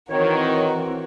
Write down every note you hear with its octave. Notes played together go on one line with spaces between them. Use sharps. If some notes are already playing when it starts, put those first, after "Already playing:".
D#3 E3 C4 F#4 A#4 C#5